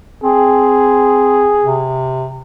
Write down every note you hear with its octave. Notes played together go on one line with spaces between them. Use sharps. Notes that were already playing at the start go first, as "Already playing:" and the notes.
C4 G#4
C3